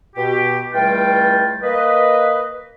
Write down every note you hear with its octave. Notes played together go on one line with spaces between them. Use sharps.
B2 G4
C#2 E3 G3 A3 F4 G5
A#3 B4 D#5